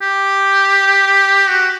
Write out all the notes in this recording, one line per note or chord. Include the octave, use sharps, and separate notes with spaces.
G4
F#4